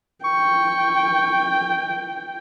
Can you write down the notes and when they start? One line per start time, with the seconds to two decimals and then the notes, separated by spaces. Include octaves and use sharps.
0.25 G5 C#6